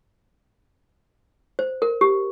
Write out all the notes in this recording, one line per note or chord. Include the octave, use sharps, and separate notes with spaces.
C5
A#4
G4